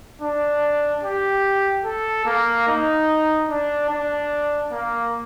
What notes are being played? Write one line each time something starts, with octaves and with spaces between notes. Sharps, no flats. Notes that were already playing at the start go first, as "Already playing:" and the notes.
D4
G4
A4
A#3
D#4
D4
D4
A#3